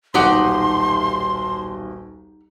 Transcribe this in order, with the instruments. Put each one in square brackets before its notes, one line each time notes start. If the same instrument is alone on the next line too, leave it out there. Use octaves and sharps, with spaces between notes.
[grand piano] D#1 B1 [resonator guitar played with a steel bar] D#4 G4 F#5 [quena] C6